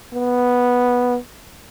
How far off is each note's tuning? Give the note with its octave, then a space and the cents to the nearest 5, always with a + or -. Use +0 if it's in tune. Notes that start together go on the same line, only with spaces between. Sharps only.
B3 -5